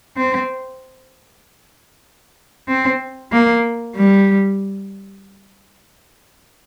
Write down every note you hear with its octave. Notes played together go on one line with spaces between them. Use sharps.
C4
C4
A#3
G3